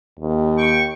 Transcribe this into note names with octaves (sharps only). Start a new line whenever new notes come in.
D#2
G5 C#6